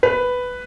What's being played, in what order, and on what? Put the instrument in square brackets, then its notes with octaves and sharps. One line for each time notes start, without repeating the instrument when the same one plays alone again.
[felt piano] B4